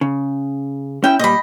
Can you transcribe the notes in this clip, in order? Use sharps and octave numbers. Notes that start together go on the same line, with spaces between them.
C#3
C#4 E4 G5
A#2 G3 D#5 B5